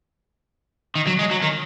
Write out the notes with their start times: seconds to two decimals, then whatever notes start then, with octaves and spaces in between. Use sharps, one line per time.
0.96 D#3
1.07 F#3
1.19 G#3
1.31 F#3
1.42 D#3